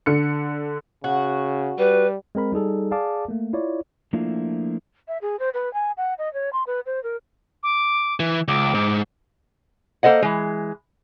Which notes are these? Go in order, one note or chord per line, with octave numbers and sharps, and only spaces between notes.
D3 C#7
C#3 F#4
G3 B4
G#3 C4 A#4 B5
G3 D#4 G#4 A4
G#4 D5 F5 A5 D6
A3 A#3
E4 F4 C#5 D5
F3 A3 A#3 D4 E4 F4
E5
G#4
C5
B4
G#5
F#5
D#5
C#5
C6
B4
C5
A#4
D6
E3
C#2 D6
G#2
A#3 A4 C5 D#5 F#5
E3 G#3